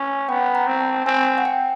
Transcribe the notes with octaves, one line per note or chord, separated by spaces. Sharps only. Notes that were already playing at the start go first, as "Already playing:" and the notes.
Already playing: C#4
B3 G5
A#5
C4
A5
C4 G#5
F#5
G5